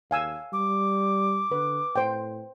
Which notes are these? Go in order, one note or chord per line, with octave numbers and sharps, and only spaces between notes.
D#2 F5 G#5 E6
G3 D6
D3 B4
A2 C5 G5